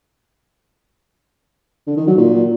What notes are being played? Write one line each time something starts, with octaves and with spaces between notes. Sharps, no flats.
D3
D#3
F#3
A#2